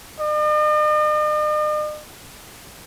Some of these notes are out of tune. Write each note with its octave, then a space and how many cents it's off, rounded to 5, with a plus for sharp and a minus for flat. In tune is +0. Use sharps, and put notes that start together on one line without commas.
D#5 -45